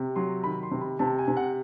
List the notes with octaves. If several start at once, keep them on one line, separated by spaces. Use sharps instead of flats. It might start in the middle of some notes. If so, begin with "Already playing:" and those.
Already playing: C3
F#3 C6
D#3 B5
C6
C3
B5
C3 A5
G#5
C3
F#5